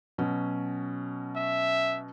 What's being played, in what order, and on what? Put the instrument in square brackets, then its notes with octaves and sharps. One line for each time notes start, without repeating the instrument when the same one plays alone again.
[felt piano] B2 F#3 C#4
[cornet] E5